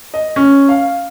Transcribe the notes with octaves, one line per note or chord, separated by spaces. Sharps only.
D#5
C#4
F5